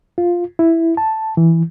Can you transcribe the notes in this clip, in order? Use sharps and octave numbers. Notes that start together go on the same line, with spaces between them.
F4
E4
A5
E3